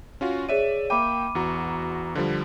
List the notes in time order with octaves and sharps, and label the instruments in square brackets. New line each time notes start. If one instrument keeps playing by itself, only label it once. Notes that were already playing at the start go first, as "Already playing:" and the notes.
[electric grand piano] C#4 F4 F#4
[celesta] G#4 C#5 D#7 [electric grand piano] D5 E5
[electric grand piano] A#3 E5 G5 [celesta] B5 D6 D#7
[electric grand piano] E2 F#4 A#5
D3 F3 G3